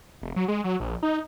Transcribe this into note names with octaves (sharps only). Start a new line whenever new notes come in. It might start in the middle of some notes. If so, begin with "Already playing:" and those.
F1
F#3
G#3
F#3
A#1
D#4